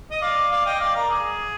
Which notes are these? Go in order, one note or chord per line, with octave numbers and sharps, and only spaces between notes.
D#5
D5 F5
D5 F5
D#5 G5
D5 F5
A#4 D5
G#4